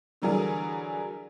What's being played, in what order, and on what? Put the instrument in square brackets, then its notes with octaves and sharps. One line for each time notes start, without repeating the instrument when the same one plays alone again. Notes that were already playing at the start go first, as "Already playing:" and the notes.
[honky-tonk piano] D3 E3 F#3 G3 G#4 A#4